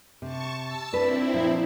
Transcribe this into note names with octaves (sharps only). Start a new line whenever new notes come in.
C3 A5 C#6
A5 E6
C4 D4 E4 B4
A#2 F3